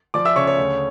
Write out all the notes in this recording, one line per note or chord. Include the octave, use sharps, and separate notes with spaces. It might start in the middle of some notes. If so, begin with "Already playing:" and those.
F3 D5 D6
E5 E6
C#3 C#5 C#6
C#5 C#6
D2